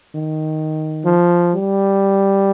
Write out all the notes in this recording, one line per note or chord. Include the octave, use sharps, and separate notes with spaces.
D#3
F3
G3